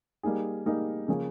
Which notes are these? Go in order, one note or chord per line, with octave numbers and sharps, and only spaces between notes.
G3 A#3 D#4 G#4
G3 A#3 D#4 G#4
C#3 F3 A#3 C#4 G#4